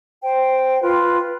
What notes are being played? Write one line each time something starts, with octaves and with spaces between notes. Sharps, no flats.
C5 G5
F4 B4